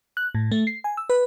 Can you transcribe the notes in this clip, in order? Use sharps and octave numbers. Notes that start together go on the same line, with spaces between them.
F#6
A2
A3
C7
G#5
E6
B4